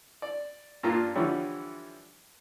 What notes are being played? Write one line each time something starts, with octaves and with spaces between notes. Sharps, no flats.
D5
G2 A#2 A#3 F4
D3 E3 F3 G3 C#5